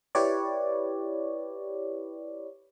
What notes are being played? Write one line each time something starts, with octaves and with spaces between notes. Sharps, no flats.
E4 G4 B4 C#5 D5